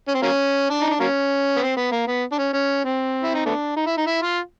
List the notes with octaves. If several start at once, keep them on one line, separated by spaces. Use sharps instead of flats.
C#4
C4
F#3 A#3 C#4
D4
D#4
D4
F#3 A#3 C#4
B3
C4
B3
A#3
B3
D4
C#4
C#4
C4
E4
D#4
A3 B3 D4
D#4
E4
D#4
E4
F4